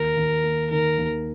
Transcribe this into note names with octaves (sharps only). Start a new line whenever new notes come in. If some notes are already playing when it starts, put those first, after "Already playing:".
Already playing: D#2 A#4
D#2
A#3
D#3 A#4
D#2